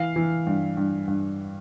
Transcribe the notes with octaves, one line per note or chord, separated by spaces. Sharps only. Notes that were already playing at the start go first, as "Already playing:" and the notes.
Already playing: E3 F5
E3
G2
G2
G2